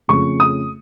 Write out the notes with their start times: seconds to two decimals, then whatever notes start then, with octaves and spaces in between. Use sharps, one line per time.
0.08 F2 C#3 F3 A3 C#6
0.40 D#6